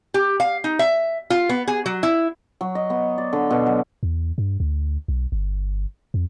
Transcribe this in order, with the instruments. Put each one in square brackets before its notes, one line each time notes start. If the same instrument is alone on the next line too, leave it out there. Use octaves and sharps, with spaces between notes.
[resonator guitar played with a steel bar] G4
F5
D#4
E5
F4
B3
G#4
F#3
E4
[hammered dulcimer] F#3
D#5
B3
D5
D3
B2
F#3
[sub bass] E2
G2
D2
B1
G1
F2